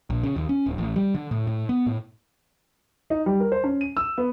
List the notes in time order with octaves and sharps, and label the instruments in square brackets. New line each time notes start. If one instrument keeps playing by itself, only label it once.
[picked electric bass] A#1
C#3
D#2
C#4
D1
A1
G3
D3
A2
A2
B3
A2
[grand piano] D#4
G3
A#4
C5
C#4
D#7
E6
B3